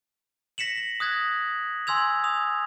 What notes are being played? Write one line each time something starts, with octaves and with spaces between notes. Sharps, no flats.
A#6 B6 C#7 E7 F#7
F#7
D#6 F#6 G#6 A#6
G#5 C6 E6 G#6 F7
D#6 F7